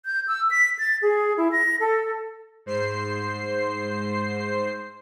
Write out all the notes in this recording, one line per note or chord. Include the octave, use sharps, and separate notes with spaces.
G6
E6
B6
A6
G#4
E4
A#6
A4
G#2 C5 C7